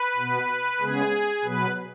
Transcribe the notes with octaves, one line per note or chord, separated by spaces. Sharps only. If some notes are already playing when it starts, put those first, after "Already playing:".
Already playing: B4
B2 B3
C#3 G#3 B3 G#4
B2 F#3 B3 B4